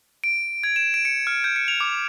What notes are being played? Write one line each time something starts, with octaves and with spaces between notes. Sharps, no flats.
D7
G#6
E7
D7
C#7
F6
G6
C#7
F7
D6